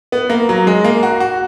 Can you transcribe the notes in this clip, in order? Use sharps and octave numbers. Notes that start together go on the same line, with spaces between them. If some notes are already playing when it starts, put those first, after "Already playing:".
B3
A#3
F#3
G#3
A#3
F#4
F#4